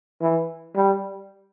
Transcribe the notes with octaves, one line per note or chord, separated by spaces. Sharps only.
E3
G3